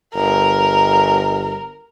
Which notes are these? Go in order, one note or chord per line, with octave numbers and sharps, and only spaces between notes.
G1 A#4